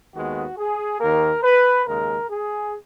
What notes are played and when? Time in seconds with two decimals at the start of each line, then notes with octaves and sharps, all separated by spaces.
0.14 D#2 D#3 G#3 B3 F#4
0.57 G#4
1.00 D#2 D#3 A#3 A#4
1.43 B4
1.86 D#2 C#3 G#3 A#4
2.29 G#4